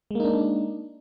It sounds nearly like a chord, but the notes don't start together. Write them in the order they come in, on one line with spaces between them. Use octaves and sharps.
G#3 A#3 D#4 D4